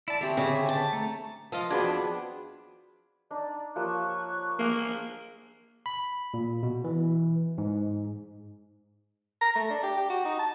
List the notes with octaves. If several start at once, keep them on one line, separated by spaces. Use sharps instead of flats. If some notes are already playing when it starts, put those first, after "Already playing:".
E4 D5 A5
D3 C4 G4 G#4 C5 C#5 E5
C#3 G4 G#5
A5
A3 A#5
F3 F4 D#5
F2 B3 D4 F#4 G#4
D4 D#4 D5
F3 A#3 G4 C#5 C#6 F#6
A#3 G#4 F5 G#5
B5
A#2
B2
E3
G#2
A#5
A3
D4
G4
G4
F#4
D#4
A5